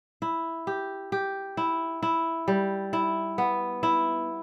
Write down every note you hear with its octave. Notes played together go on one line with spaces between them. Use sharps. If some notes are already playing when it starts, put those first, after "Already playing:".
E4
G4
G4
E4
E4
G3
E4
B3
E4